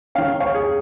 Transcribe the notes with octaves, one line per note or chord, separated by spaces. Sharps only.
D#3 C#4 F5
C#5 F5
G#4